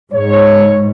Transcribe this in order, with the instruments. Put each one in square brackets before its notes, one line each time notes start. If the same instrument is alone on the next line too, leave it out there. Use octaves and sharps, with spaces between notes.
[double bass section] G#2 [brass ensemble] C#5